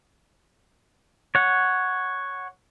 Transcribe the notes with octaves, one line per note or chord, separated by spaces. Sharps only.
C#5 F#5